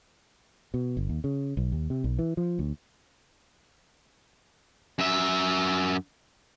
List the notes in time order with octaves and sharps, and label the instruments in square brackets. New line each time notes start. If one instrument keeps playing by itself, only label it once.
[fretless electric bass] B2
G1
D#2
C#3
B1
D#2
C3
B1
E3
F3
D2
[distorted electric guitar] F#2 E5